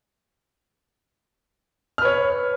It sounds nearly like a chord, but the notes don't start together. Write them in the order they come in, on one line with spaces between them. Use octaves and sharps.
F6 B4 C#5